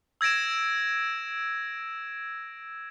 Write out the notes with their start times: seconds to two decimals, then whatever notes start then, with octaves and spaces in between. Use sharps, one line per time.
0.21 E6 G#6 A#6 D7 E7